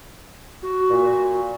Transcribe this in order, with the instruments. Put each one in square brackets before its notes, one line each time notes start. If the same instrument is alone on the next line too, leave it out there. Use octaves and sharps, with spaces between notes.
[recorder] F#4
[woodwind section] A#2